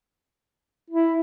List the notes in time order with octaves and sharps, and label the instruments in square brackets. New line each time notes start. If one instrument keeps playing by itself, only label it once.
[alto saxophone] E4